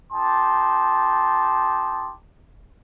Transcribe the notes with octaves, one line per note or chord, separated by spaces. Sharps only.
D#4 G4 A5 C6